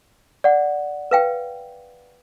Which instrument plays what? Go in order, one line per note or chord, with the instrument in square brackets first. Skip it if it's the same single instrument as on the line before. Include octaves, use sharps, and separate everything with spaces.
[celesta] D5 F#5
[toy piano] B4 F5 G5